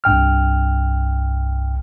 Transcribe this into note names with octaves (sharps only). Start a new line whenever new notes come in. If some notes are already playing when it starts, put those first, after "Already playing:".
C2 G2 G5 F6